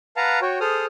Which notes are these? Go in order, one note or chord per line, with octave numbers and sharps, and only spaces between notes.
B4 F5 F#5 A5 A#5
F#4 C#5 G5
G#4 A4 C5 D#6 F6